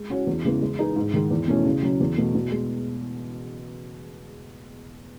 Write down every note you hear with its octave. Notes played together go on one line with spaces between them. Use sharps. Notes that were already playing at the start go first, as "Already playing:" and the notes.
Already playing: G#3
C#4 F#4 C#5
E2
C#3 E3 G#3 B3
G#3
D#4 G#4 B4
G#2
D#3 G#3
E2
B2 A3 C#4 E4
C#3
F#3 C#4
E2
B2 A3
B2
G#3